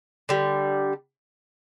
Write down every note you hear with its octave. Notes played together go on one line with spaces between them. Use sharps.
D3 G3